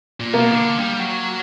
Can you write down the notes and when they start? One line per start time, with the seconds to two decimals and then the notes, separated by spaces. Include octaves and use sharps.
0.20 A#2
0.33 B2 A#3
0.51 E3
0.55 D3
0.78 G3
0.99 F#3